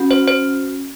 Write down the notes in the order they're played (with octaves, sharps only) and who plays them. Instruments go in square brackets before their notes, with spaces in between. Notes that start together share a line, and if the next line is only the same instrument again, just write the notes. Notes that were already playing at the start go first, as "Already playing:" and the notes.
Already playing: [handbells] C#4 F#4
C5
C5